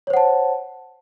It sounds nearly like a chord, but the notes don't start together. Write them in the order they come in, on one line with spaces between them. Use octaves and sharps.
C#5 C5 F#5 A5